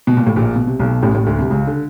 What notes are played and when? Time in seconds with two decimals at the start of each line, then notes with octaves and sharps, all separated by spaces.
0.07 B2
0.17 A#2
0.27 A2
0.36 A#1 A#2
0.55 B2
0.67 C3
0.80 B1 B2
1.03 A1 A2
1.14 A1 A2
1.27 D2 D3
1.38 C2 C3
1.50 C#2 C#3
1.67 D3